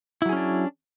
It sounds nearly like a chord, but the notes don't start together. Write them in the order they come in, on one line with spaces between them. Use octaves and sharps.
E4 F#3 G#4 C#4 D4